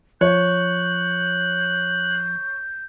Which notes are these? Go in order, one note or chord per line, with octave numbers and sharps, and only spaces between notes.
F3 C#5 F#6 G6